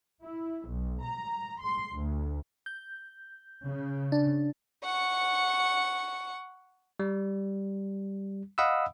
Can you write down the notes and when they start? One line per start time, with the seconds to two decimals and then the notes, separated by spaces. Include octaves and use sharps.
0.21 E4
0.67 B1
1.03 A#5
1.60 C6
1.93 D2
2.66 G6
3.66 C#3
4.12 D4
4.84 F#5 C#6
7.00 G3
8.58 D#5 F5 F#5 B5 D#6 E6